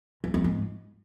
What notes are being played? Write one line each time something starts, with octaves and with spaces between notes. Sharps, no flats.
E2
F2
G#2